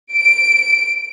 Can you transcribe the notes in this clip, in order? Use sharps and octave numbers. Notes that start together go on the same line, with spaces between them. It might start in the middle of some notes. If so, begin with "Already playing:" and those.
D7